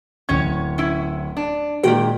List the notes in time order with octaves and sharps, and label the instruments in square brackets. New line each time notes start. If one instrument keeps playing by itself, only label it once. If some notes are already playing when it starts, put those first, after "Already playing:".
[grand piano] D1 G#6 [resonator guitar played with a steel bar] C#4 C#5
[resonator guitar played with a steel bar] C#4 E4
D4
[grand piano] A#2 D#3 G#3 [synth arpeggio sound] F#4 A#4 [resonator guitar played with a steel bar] G4 G5